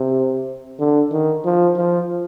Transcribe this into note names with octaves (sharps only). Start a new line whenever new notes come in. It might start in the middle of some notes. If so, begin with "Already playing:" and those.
Already playing: C3
D3
D#3
F3
F3